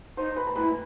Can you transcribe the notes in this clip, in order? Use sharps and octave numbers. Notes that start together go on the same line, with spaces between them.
D#4 C5 C6
B4 B5
A#5
E4 B4 B5